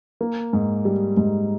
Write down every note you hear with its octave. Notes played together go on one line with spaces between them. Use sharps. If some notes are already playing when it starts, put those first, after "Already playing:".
A#3
G#2
G3
G#2